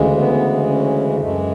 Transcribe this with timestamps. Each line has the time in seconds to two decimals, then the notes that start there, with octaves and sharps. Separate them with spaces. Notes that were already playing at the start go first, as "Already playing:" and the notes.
Already playing: D2 C#3 E3 G#3
0.17 B3
0.69 C#4
1.20 F#2 E3 G#3 A3